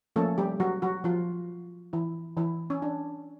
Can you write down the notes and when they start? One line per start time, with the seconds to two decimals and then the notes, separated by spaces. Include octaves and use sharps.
0.16 F3 A3 A#3 C#4 A4
0.38 G3 G4
0.60 F#3 F#4
0.82 F#3 F#4
1.04 F3 F4
1.93 E3 E4
2.37 E3 E4
2.70 C#4
2.82 D4